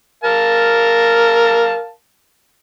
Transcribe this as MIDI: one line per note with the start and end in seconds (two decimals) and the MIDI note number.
0.24 1.90 70
0.24 1.90 77
0.24 1.90 81